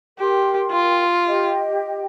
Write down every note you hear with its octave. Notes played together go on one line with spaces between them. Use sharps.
G4 A#4 G5 C6
F4
G4 D#5 G5